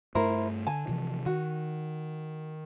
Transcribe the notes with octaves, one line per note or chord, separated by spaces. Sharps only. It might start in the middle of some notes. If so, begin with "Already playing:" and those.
G2 A3 E4 A#4 C5
D3 G#5 A5
C3 E3 F3
D#3 F#4